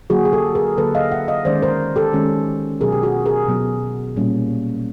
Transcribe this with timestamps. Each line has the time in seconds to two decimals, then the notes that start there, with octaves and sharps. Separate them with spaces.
0.10 D3 F#3 A#3 F#4 G#4
0.25 G#4
0.33 G4 A4
0.55 G#4 A#4
0.78 D3 F#3 A#3 A4 B4
0.95 D#5 F5
1.12 E5 F#5
1.28 D#5 F5
1.45 D#3 G#3 C#4 C5 D5
1.62 A#4 C5
1.96 G4 A4
2.13 D#3 G#3 C#4
2.81 B2 F#3 B3 G#4 A#4
2.92 G4
3.03 F#4 G#4
3.26 G#4 A#4
3.49 B2 F#3 B3
4.16 A#2 G3 A#3 C#4